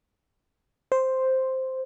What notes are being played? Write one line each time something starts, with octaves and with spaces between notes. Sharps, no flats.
C5